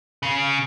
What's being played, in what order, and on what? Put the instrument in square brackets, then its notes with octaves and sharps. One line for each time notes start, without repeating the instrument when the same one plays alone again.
[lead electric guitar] C#3